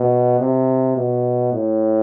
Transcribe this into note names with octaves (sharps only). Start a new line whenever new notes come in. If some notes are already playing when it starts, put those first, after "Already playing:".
Already playing: B2
C3
B2
A2